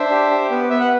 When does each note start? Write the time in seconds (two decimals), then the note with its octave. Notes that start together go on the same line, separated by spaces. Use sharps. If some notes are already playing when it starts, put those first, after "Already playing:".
Already playing: D4 C5 E5
0.11 G4
0.31 G4
0.50 B3
0.70 B3 E5
0.80 F#5